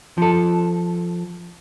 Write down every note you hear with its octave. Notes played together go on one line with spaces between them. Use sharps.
F3 A4